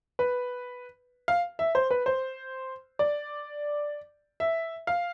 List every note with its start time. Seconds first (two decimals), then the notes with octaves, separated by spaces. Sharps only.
0.19 B4
1.28 F5
1.59 E5
1.75 C5
1.91 B4
2.06 C5
2.99 D5
4.40 E5
4.87 F5